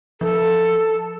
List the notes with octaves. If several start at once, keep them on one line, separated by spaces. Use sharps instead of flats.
F3 A4